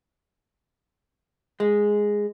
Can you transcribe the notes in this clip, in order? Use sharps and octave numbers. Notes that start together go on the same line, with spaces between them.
G#3